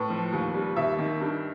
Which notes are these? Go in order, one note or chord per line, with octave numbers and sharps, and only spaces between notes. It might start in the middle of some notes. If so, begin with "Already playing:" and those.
Already playing: A2 B4
F3
D#2
G3
D#2 E5
D#3
G2